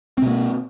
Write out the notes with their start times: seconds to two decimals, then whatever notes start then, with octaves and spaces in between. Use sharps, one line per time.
0.18 C4
0.22 B2
0.27 A#3